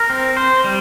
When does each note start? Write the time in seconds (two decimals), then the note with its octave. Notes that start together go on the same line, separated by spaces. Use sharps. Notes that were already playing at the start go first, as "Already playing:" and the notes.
Already playing: A#4
0.10 C4
0.37 C5
0.64 G3